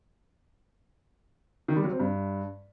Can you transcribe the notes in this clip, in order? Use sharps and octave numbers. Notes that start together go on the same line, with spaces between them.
D#3
G3
F#3
C4
G2